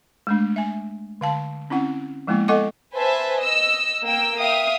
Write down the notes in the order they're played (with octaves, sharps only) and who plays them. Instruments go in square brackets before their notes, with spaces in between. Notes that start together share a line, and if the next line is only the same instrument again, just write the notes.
[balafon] G#3 A3 D4
E5 G#5
D3 F5 A5
C4 C#4 E4 F#5
F3 G#3 A#3 B3 E4
B3 A4 D#5 F#5 C#6 D6
[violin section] B4 C5 E5 G#5 A5
D#5 E6
A#3 G5 E6
E5 F5 G5 D#6